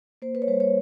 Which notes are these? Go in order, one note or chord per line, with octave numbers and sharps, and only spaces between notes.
A#3 C5
B4
C#5
G3 C5
C#5